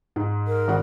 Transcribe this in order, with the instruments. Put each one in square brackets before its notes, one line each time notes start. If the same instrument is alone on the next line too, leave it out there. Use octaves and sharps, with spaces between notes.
[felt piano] G#2
[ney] A#4
[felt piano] G#1 F#5